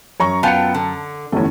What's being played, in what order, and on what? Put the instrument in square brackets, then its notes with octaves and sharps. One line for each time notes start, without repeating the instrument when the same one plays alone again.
[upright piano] F#2 [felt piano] C#5 A#5 C#6
[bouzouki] B3 F4 G5 [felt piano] A5 C#7
[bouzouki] D3
[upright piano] G1 G3 C#4 [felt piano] E2 A3